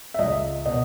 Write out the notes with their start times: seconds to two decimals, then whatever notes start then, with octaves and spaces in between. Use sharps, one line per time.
0.14 E5
0.19 C#2 D#5
0.65 B2 D#5